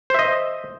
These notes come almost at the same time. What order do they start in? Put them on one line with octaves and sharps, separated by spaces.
C5 E5 D#5